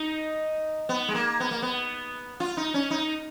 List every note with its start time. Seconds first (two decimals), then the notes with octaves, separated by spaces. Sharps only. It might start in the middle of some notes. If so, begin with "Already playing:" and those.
Already playing: D#4
0.89 B3
1.08 G#3
1.15 A#3
1.40 B3
1.51 A#3
1.62 B3
2.40 F4
2.57 D#4
2.74 C#4
2.90 D#4